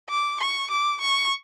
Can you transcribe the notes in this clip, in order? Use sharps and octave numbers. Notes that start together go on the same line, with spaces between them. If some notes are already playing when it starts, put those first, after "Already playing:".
D6
C#6
D6
C#6